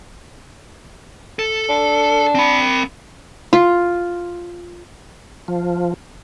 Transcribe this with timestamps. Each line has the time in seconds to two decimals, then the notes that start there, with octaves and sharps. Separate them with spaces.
1.39 A4
1.69 D4
2.35 C4 B5
3.53 F4
5.48 F3